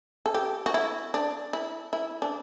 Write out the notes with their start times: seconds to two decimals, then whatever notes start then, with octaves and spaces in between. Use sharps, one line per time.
0.26 A4
0.34 G4
0.66 F#4
0.74 E4
1.14 D4
1.53 E4
1.93 E4
2.22 D4